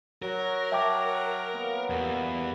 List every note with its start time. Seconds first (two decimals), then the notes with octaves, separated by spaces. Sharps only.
0.22 F#3 A#4
0.72 E5 G5 A5 D6
1.53 A#3 B3 F#4
1.90 E2 G2 F4 B4